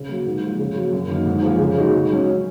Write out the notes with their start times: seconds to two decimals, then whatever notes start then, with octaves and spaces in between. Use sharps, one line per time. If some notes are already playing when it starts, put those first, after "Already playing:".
Already playing: C#3
0.09 F#3 A#3
0.26 G#2
0.43 F3 G#3
0.59 C#3
0.76 F#3 A#3
0.93 F#2
1.09 D#3 A#3 D#4
1.26 G#2
1.43 F3 A#3 F4 G#4
1.59 C#3
1.77 G#3 D#4 F#4
1.93 G#2
2.10 F#3 C#4